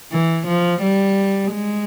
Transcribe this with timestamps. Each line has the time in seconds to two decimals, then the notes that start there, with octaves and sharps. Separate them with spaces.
0.12 E3
0.48 F3
0.82 G3
1.53 G#3